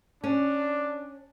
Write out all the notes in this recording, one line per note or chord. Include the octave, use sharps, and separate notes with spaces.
C#4 D4